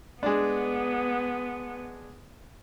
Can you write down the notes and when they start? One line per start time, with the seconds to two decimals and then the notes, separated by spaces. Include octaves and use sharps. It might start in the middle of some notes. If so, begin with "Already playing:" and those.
0.23 G#3 B3 D4